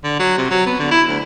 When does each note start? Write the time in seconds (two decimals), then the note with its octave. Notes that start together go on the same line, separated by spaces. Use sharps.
0.04 D3
0.19 F#3
0.38 C3
0.50 F#3
0.66 B3
0.80 D3
0.91 E4
1.08 D2